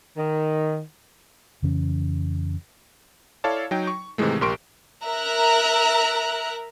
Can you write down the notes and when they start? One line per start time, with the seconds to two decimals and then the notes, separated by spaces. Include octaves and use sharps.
0.17 D#3
1.63 F2 C#3 E3 C#4
3.44 E4 A4 C#5 D5 F5 A5
3.71 F#3 D#4 G5
3.87 C#6
4.18 G#2 C3 D#3 E3 G#3 A3
4.41 A#1 G4 A#4 C6 C#6 D7
5.05 A#4 E5 A#5 F#6